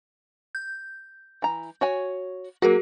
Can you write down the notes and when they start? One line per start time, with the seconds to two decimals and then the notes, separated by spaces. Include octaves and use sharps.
0.55 G6
1.42 E3 A#5
1.81 F#4 C#5 G#5
2.62 F#3 A#3 F#4 G#4 A#4